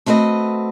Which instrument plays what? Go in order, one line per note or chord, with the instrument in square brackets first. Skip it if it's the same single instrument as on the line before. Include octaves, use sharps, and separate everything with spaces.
[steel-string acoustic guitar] A3 C4 F#4 B4 D#5